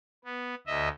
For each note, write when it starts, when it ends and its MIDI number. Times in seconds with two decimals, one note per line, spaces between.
0.24 0.55 59
0.67 0.89 38
0.67 0.89 75
0.67 0.89 76